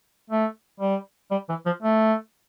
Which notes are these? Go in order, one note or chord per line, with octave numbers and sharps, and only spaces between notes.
A3
G3
G3
E3
F3
A3